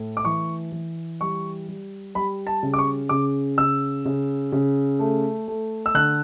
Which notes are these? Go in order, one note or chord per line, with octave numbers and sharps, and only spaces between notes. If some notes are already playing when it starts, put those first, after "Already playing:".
Already playing: A2 A3
D6
E3 C#6
E3
G3 C#6
G3
G3 B5
A5
C#3
D6
C#6
C#3 D6
C#3 E6
C#3
C#3
A3
A3
E6
D3 F#6